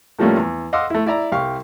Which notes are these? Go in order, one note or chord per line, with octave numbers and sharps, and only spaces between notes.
A2 F3 G3 A3 A#3 C#4
E2
D#5 F5 F#5 C6 D6 E6
A3 E4
E4 D5 E5 A#5
C2 G4 F5 C#6